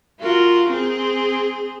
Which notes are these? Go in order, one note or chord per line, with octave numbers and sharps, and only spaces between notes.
F4 F#4 A#4
C4 G#4